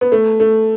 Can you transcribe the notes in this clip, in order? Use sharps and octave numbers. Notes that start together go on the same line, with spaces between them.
B3
A3
A3